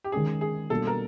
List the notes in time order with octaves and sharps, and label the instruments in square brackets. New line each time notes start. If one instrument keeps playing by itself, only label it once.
[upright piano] G4
[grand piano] D#3 G#3 C#4 [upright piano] G#4
[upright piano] G#4
[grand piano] B2 G3 A#3 D4 [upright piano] A4
[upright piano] A#4